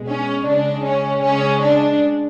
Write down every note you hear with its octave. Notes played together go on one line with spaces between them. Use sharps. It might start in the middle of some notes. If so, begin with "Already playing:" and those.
Already playing: B2 G#3
C#4
C#3 G#3 D4
C#4
C#3 G#3 C#4
D4